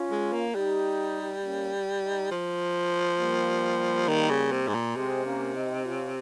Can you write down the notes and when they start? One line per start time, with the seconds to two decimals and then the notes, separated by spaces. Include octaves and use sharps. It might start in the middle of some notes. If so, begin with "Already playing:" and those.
Already playing: C#4 F4
0.11 G#3
0.33 A#3
0.55 G3 D#4 G4
1.43 A#3 C#4
2.02 D#4 G4
2.31 F3
3.19 G3 A#3
4.08 D#3
4.30 C#3
4.52 C3
4.68 G#2
4.74 A#2
4.95 C3 G#3 C4
5.25 A#3 C#4
5.55 C4 D#4
5.84 C#4 F4